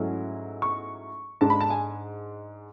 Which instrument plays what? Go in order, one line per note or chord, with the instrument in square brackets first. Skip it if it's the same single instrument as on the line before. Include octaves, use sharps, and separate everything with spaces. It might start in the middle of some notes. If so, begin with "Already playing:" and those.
Already playing: [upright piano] G#2 F#3 A3 C#4 E4
C#6
G#2 G#3 D4 A5
B5
A5
G#5